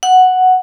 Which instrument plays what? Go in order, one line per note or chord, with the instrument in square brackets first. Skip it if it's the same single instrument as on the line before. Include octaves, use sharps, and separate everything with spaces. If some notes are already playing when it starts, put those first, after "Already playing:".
[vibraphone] F#5